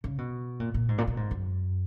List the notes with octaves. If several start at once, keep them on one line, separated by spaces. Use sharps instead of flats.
C#3
B2
A#2
A#2
G#2
A#2
B2
G#2
F#2